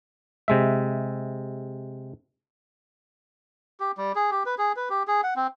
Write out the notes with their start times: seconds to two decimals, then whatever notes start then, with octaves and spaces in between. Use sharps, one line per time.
0.48 C3 G#3 E5
3.80 G4
3.98 G3
4.15 G#4
4.31 G4
4.46 B4
4.58 G#4
4.76 B4
4.90 G4
5.08 G#4
5.24 F#5
5.36 C4